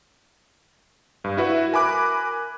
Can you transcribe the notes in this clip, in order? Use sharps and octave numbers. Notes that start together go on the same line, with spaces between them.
G2
E4 F#4 B4 E5
A#4 G#5 B5 D6 F#6